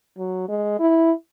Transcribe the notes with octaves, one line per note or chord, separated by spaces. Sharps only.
F#3
G#3
E4